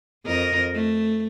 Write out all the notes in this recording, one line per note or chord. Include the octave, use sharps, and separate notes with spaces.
F2 A#4 D#5
A3